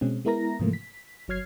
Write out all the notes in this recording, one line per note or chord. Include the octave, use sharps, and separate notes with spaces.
B2 G#3 C4 C#4
G#3 B3 E4 A#4 A#5 A#6
G#2 C3 E3 F3 A3 A#3
B6
G1 F#3 C#5 F6 G#6 C7